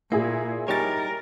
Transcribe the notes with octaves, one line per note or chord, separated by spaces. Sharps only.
A#2 A#3 E4 G#4
G3 D#4 G4 A#4 C#5 G#5 A6